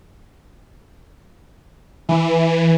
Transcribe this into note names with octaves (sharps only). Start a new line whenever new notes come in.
E3